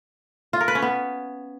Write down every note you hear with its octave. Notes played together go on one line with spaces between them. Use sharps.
F4
A#4
B4
C#4
B3